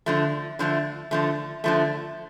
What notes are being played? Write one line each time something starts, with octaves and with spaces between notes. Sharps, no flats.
D3 F3 A3
D3 F3 A3
D3 F3 A3
D3 F3 A3